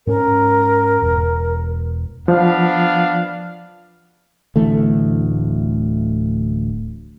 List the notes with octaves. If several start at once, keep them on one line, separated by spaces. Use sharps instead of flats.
G#2 C#4 A#4
E1
F3 B3 D4 F5
D1 D2 E3 A3